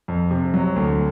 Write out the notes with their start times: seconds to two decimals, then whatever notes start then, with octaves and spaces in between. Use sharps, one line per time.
0.08 F2
0.31 C3
0.54 F#3
0.76 D2